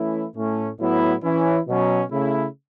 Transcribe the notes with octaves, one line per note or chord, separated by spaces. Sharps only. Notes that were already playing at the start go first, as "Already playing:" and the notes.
Already playing: E3 A3 C#4 E4
A2 A3 C#4
A2 F#3 B3 E4
E3 C#4 E4
B2 F#3 C#4
C#3 A3 E4